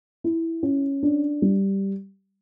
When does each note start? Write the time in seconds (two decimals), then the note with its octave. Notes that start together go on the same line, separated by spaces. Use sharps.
0.24 E4
0.63 C#4
1.03 D4
1.42 G3